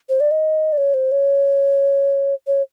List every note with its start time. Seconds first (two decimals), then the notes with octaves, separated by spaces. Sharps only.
0.09 C5
0.20 D5
0.31 D#5
0.73 D5
0.78 C#5
0.94 C5
1.12 C#5
2.47 C#5